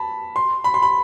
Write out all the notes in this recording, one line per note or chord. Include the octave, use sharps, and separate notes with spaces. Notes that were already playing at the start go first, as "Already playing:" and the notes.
Already playing: A5 B5
C6
B5
C6
B5